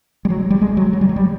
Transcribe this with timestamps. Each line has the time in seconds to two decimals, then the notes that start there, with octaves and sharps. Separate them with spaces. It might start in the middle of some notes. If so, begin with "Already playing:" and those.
0.25 G3
0.30 F#3
0.50 G3
0.61 G#3
0.77 F#3
0.93 F#3
1.01 G3
1.09 F#3
1.16 G3